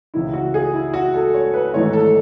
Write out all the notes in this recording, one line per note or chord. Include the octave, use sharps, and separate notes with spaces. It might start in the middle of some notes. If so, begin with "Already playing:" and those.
C#2 C#3 E3 E4
F#4
G#4
E4
F#4
A4
C#5
B4
G#1 G#2 E3 A3 C#5
A4